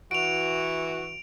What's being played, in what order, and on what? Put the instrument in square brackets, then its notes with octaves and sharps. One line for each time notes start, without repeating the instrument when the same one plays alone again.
[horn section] E3 F#4 [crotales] D7 F7